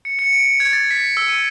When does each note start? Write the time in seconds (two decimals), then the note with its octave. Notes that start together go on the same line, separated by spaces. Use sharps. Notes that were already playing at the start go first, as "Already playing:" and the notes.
0.05 C#7
0.19 C#7
0.33 D7
0.46 C#7
0.60 G#6
0.73 A6
0.91 B6
1.17 E6
1.29 D#7